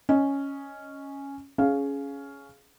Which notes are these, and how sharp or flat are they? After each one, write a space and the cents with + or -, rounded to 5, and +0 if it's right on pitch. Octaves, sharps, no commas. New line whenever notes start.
C#4 +0 D#5 +0
C#4 +10 G#4 +15 F5 +0